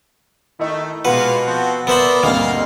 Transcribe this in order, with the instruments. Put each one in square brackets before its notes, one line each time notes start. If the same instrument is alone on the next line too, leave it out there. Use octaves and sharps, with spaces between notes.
[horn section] D#3 A3 [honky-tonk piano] E4 D#5
[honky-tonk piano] B2 F#5 [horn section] G#3 A#3 F4 [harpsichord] B4
[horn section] F3 C4 F#4
[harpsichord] B3 C5 B5 [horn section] A#4 D5 E5
[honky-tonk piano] D2 G2 C4 [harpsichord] A#3 [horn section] D#5 F5